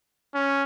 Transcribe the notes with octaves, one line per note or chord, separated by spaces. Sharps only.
C#4